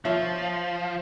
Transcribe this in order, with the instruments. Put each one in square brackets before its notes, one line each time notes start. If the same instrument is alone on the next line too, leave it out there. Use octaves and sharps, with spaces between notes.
[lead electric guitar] F3 [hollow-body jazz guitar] F4 C#5 E5